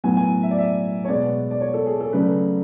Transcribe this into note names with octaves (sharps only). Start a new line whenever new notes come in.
A2 F#3 B3 G#5
G#5
E5
D5
E5
C#5
B2 G#3 B3 D5
D5
C#5
A4
G#4
A4
C#3 F#3 A3 D4 B4